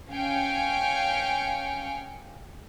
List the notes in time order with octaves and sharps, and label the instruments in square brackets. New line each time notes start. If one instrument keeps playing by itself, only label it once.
[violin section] C#4 F5 G5 G#5 C#7 D7